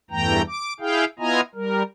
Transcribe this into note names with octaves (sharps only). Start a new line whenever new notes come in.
E2 G2 E3 A3 G5 A#5
D6
E4 G#4 F5 G5
B3 E4 F4 D#5 G#5 A#5
G3 A#4